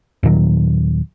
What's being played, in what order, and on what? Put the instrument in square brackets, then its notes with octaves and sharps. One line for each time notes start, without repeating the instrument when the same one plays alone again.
[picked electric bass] D#2 A#2 D#3 F#3